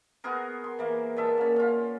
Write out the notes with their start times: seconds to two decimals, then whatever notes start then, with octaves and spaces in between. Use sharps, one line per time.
0.24 B3 F#4 G#4 A#4
0.64 C6
0.79 E3 A#3
1.16 A#2 G#3 E5 A5
1.37 A#3 C#4
1.56 C#4 F4